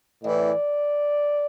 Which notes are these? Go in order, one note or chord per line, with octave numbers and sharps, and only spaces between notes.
A2 E3 D5